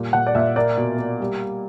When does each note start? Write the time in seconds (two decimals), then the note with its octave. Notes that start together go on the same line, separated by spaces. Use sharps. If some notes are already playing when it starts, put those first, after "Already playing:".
Already playing: A#2 G3
0.13 A#2 F#5
0.27 D5
0.35 A#2 E5
0.56 A#3 D5
0.77 B2
0.98 A#3
1.20 G3